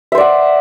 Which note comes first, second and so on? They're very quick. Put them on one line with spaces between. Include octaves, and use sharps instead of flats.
E5 C5 D5 F#5